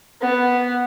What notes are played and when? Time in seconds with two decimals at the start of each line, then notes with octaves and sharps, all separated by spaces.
0.21 B3